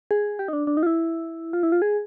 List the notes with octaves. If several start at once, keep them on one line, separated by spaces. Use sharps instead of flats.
G#4
G4
D#4
D4
D4
D#4
F4
E4
F4
E4
F4
G#4